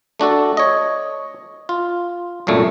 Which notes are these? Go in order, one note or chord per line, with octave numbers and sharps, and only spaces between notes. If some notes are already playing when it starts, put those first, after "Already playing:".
A3 D4 F#4 A4
C#5 D#5
F4
C2 F#2 A#2 A3